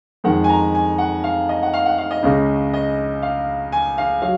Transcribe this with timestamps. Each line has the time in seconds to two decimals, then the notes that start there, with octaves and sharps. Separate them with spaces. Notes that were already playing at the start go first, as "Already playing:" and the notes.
0.24 F2 D#3 G#3 F#5
0.44 G#5
0.49 A#5
0.74 G#5
0.98 F#5
1.24 F5
1.49 D#5
1.62 F#5
1.74 F5
1.85 F#5
1.98 F5
2.11 D#5
2.23 C#2 C#3 G#3
2.73 D#5
3.22 F5
3.72 G#5
3.98 F5
4.22 F#3 F5